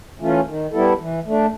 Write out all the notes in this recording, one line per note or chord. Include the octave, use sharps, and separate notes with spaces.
E3 A3 C#4 F4
D#3
G3 B3 E4 A4
E3
A3 D4